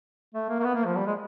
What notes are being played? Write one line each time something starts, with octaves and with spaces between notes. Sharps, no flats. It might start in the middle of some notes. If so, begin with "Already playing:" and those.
A3
A#3
A#3
B3
A#3
F3
G3
G#3